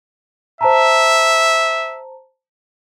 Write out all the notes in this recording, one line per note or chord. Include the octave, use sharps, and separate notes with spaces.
C5 E5 A5 A#5